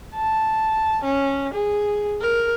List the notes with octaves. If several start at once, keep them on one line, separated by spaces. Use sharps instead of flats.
A5
C#4
G#4
A#4